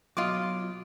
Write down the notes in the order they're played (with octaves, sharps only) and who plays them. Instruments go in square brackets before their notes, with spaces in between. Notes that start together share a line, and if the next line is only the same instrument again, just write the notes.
[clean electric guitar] B2 F#3 [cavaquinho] F4 D#5 D6